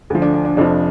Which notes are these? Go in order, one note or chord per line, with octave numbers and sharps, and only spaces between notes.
D2 D3 F3
D4
D4
D4
F1 F2 F3 D4